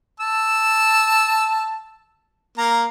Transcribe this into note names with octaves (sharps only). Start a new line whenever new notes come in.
A5 E6
A#3 A#5